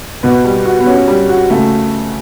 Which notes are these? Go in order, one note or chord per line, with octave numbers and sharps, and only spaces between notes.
B2 B3
G3
F#4
B3
C#4 F#4
G3
F#4
C#3 A3